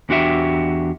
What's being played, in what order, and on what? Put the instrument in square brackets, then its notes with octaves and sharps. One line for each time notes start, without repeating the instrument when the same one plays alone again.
[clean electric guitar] E2 D4 F#4 G4 E5